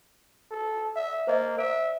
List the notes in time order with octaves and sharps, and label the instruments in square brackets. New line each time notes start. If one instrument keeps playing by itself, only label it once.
[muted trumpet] A4
E5
[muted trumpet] A#3 [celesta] C5 D#5
[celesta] C5 D7 [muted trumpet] E5